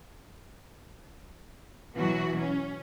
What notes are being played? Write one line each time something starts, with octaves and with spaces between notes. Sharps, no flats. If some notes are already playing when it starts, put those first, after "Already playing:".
B2 E3 F#3 F#4
C#4